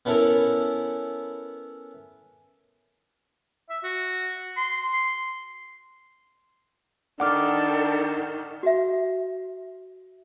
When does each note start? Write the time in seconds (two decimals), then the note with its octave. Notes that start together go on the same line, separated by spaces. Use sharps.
0.05 B3 C#4 E4 A4 A#4
3.70 E5
3.84 F#4
4.57 C6
7.20 D#3 D4 A4 F#5 D6 F6
8.63 F#4 E5